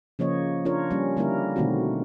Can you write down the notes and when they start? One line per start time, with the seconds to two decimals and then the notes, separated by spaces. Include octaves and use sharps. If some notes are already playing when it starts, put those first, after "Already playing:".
0.19 C#3 F3 A#3 C#5 D#5
0.65 D4 F4 A#4 C#5
0.90 G3 A#3 C#4
1.17 D3 G3 A#3 D#4 E4 A#4
1.56 B2 D3 D#3 A3 C4 F#4